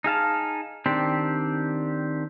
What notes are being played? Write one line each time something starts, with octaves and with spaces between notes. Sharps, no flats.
D#4 G#4 F5 A5
D#3 C4 D4 G4